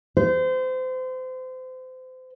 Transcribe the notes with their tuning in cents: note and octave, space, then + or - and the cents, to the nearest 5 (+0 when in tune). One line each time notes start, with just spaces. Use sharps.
C5 -30